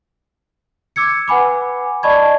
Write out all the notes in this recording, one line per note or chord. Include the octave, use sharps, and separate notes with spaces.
D6 E6 G#6 C#7
B4 F#5 G#5 B5 D6
D5 D#5 A5 B5 C#6 G#6